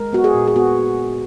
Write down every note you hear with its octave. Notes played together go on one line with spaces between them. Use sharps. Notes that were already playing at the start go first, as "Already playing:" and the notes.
Already playing: G#3 A#4
B3 F#4
G#4
A#2
G#4
B3 F#4